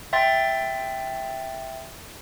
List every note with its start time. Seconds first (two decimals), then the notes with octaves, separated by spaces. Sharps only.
0.13 E5 G5 C6 A6